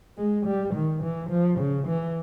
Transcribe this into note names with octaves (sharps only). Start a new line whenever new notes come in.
G#3
G3
D#3
E3
F3
C#3
E3